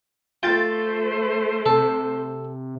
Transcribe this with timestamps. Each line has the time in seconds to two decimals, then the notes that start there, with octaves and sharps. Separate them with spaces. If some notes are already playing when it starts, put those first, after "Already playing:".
0.43 A3 F4 C5 G5 A6
1.66 C3 A4